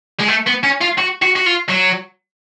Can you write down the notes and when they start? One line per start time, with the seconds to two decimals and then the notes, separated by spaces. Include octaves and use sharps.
0.19 G#3
0.28 A3
0.46 B3
0.63 C#4
0.81 F4
0.98 F#4
1.22 F#4
1.36 F#4
1.46 F4
1.68 F#3